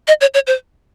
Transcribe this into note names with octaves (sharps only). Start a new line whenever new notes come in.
D#5
C#5
C#5
C5